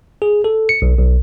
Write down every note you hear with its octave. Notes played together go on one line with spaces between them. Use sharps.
G#4
A4
C#7
B1
B1